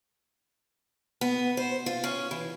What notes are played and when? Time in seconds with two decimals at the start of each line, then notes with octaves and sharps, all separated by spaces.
1.21 B3
1.57 C5
1.86 F4
2.04 C#4
2.31 E3